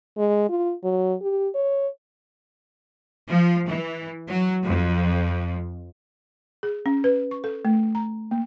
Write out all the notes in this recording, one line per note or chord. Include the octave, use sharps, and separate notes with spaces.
G#3
F4
F#3
G4
C#5
F3
E3
F#3
F2
G#4
C#4
B4
C#6
A4
A3
A#5
A#3